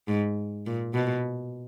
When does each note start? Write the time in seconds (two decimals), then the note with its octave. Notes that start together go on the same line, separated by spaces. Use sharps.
0.08 G#2
0.66 A#2
0.94 B2